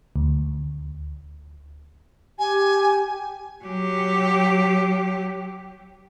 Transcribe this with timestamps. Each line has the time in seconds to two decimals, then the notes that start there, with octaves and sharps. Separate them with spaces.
0.16 D2
2.39 G4 G#5
3.64 F#3 G4